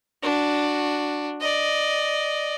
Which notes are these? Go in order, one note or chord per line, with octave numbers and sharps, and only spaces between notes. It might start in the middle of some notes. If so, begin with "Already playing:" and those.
D4 F#4
D5 D#5